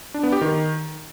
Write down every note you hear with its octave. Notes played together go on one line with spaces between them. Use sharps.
D4
B3
G4
D#3